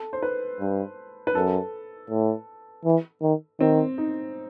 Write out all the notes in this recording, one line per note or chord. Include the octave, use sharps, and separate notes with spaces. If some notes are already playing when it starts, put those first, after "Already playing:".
Already playing: A4
C5
B4
G2
B4
F#2 A4
A2
E3
D#3
D#3 C4
D#4